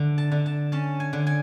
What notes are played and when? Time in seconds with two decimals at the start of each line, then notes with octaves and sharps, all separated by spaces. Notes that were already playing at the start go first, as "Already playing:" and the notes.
Already playing: D3
0.18 A5
0.32 D3
0.46 A5
0.72 C#4 A5
1.00 G#5
1.13 D3
1.27 G#5